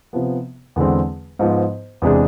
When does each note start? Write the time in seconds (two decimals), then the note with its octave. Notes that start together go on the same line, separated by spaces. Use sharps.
0.13 C3 F3 B3
0.76 E2 D3 G#3 C4
1.39 G#2 F3 B3
2.02 E2 C3 G#3 D4 G#4